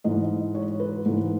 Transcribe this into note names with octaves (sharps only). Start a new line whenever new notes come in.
G#2 E3 D#5
C#5
B4
G#2 E3